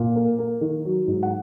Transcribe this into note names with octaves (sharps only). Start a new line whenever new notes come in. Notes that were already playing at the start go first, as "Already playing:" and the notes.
Already playing: A#2
A#3
A#3
D#3
F#3
G#2
F#5